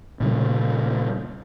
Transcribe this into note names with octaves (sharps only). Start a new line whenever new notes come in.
A#2 C#3 G3